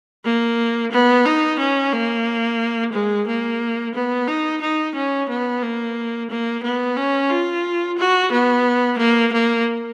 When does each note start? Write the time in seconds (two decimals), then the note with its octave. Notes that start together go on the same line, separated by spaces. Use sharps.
0.24 A#3
0.91 B3
1.25 D#4
1.59 C#4
1.92 A#3
2.93 G#3
3.27 A#3
3.94 B3
4.27 D#4
4.61 D#4
4.95 C#4
5.29 B3
5.62 A#3
6.30 A#3
6.63 B3
6.96 C#4
7.30 F4
7.97 F#4
8.32 B3
8.98 A#3
9.32 A#3